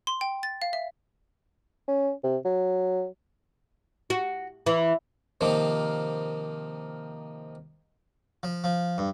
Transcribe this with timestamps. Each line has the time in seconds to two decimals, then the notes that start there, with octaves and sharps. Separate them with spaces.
0.07 C6
0.21 G5
0.43 A6
0.62 F5
0.73 E5
1.88 C#4
2.23 C3
2.45 F#3
4.10 F#4
4.66 E3
5.41 C3 D#3 F3 A#3
8.43 F3
8.64 F3
8.98 G2